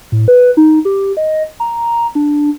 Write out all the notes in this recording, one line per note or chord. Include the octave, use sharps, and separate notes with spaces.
A2
B4
D#4
G4
D#5
A#5
D4